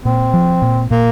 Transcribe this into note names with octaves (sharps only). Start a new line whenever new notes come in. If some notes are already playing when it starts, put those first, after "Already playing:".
A#2 C4
F3
A#2
A#2 A#3